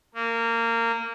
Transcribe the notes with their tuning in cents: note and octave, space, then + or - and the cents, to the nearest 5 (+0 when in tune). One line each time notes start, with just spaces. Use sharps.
A#3 -20